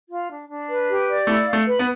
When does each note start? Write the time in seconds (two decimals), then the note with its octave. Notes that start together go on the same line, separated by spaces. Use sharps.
0.09 F4
0.30 D4
0.48 D4
0.68 B4
0.89 G4
1.08 D5
1.27 A3 E4
1.47 F5
1.53 A3
1.67 B4
1.79 B3